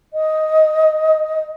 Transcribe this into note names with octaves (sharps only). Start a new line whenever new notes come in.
D#5